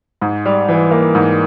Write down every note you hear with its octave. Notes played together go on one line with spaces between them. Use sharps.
G#2
G3
E3
A#3
G#2